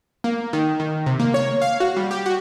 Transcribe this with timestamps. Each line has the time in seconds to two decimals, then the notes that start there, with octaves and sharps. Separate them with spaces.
0.24 A#3
0.53 D#3
0.80 D#3
1.06 C3
1.19 A#3
1.34 C#5
1.62 F5
1.80 F#4
1.97 G3
2.11 G4
2.26 F#4